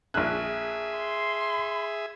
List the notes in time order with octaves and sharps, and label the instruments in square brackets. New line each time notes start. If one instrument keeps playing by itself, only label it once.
[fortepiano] A#1 F#6 [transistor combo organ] G#4 E5
[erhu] C6